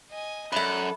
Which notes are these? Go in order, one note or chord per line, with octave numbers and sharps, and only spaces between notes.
D#5 G#5
F#2 D4 A4 E5 B5 F#6